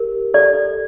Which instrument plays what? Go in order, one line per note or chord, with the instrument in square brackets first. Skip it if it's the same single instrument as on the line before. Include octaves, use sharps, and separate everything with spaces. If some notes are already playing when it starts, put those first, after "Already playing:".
Already playing: [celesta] G4 [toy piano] A#4
[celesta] A4 [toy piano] D5